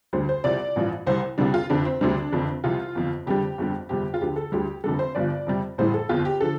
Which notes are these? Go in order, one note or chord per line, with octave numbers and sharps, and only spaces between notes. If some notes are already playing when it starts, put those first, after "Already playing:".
D2 D3 G3 C5
C5
C2 C3 F3 D5
A1 G2 F3
C2 C3 G3 C5
C2 C3 G3 D4
F4
F1 F2 D3 F3 D4
C4
D2 C3 G3 D4
F1 F2 D3
C2 C3 F3 F4
G1 F2 F3
F1 F2 D3 G3 G4
G1 F2 D3 G3
G1 F2 C3 G3 G4
F4
D2 D3 F3 G4
A4
D2 D3 G3 G4
F1 F2 D3 G3 A4
C5
G1 G2 F3 D5
F2 C3 G3
A1 A2 G3 C5
A4
G1 F2 F3 F4
G4
D3 F3 A4